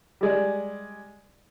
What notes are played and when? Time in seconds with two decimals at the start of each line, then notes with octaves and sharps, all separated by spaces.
0.21 G3 G#3 D5